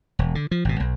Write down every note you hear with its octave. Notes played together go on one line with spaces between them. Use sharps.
E1
D3
F3
G#1 B2
B1